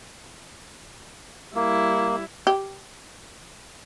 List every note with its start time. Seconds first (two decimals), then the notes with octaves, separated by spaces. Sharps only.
1.55 G3 A#3 E4
2.47 G4